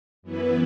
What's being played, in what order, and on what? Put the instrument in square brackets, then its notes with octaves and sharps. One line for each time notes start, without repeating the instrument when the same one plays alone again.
[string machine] F#2 E3 B3 E4 B4